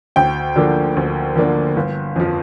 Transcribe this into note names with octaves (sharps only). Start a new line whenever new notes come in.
D2 G5
D3 F3 A#3 D4
D2
D3 F3 A#3 D4
G1
F2 F3